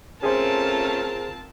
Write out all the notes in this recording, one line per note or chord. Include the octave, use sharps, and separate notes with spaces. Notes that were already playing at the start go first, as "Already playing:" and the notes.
A3 C4 C#4 F4 G#4 A#4 C5 A5